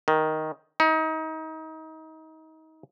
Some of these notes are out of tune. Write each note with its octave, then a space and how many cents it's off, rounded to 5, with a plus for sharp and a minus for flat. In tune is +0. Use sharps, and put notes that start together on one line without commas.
D#3 +5
D#4 +30